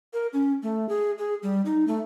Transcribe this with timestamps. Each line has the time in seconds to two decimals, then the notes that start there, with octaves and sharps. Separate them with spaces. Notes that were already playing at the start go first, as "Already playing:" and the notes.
0.13 A#4
0.33 C#4
0.63 A3
0.89 G#4
1.18 G#4
1.43 G3
1.65 D#4
1.88 A3